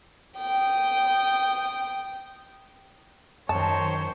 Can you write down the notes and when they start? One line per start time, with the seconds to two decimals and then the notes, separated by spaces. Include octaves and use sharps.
0.39 G5 D#6
3.49 F#2 D#3 C5 C#5 A5